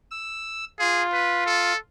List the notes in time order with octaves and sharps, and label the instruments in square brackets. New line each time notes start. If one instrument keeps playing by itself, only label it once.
[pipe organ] E6
[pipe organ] F4 [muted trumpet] G#4
[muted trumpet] B4
A4